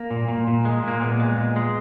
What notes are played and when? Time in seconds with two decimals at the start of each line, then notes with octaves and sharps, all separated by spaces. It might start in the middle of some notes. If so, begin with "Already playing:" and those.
Already playing: A#3
0.11 A#2
0.28 A#2
0.47 A#2
0.65 G#3
0.83 A#2 A#3
1.01 A#2 B3
1.20 G#3
1.38 A#2
1.56 G#3